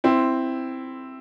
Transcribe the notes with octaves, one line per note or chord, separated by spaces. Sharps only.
C4 E4